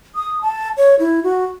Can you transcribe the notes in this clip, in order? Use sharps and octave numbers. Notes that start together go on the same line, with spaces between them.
D#6
A5
C#5
E4
F#4